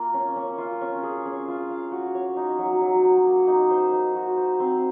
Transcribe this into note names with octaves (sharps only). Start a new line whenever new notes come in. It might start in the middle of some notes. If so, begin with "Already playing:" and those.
Already playing: A#3 F4
C#4
C#4
F4
C#4
G#4
C#4
F4
F5
F#4
C#5
D#4
F#3
F#3
F#3
A#3
D#4
C5
D#4
F#4
C5
C4